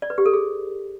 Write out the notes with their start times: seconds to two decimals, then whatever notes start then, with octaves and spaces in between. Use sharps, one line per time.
0.02 D5
0.10 B4
0.18 G4
0.26 A4
0.33 G#4